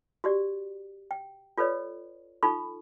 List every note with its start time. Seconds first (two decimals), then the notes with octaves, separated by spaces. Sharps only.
0.24 F#4 G4 D5
1.11 G5
1.58 F4 A4 B4 C#5 D5
2.43 D#4 F4 A4 B5 C#6